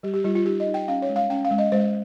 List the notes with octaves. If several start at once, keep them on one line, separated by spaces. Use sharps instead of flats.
G3 G4
G4
G3 F4
F4
D#4 G4
D#5
D#4
G5
C#4 F5
C#5
G#3
F5
C#4 G5
F5
G#3
D#5
G#3 C5